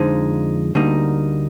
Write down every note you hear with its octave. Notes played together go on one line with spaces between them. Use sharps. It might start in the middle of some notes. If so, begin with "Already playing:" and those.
Already playing: F2 D3 F3 G#3 D#4
D2 D3 G3 A#3 D#4